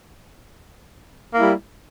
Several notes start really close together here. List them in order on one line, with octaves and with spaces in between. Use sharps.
A#3 E4 G3